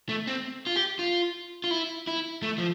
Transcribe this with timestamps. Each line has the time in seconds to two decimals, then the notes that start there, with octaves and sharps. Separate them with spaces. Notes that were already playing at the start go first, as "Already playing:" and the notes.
0.09 A3
0.27 C4
0.67 F4
0.76 G4
0.99 F4
1.64 F4
1.71 E4
2.07 E4
2.42 A3
2.58 F3